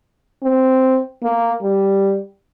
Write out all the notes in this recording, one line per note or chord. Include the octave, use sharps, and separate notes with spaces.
C4
A#3
G3